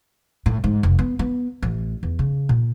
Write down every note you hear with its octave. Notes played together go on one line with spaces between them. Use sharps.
A2
G#2
F1
B3
B3
A1
E2
C#3
A#2